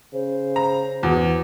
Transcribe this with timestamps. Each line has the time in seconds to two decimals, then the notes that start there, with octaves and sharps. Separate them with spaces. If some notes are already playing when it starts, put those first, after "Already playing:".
0.13 C#3 C5
0.56 A#5
1.03 E2 F#4